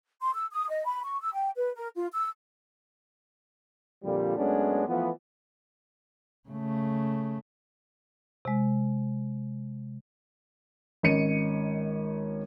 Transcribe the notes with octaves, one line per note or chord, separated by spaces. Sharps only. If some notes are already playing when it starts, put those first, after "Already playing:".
C6
E6
D#6
D#5
B5
C#6
E6
G5
B4
A#4
F4
E6
F2 A#2 D3 F3 G3
F#2 G#3 A3 B3 C#4 D4
E3 F3 A3 B3
C#3 A3
C3 G#3
G#1 C#4 D#5 C#7 D#7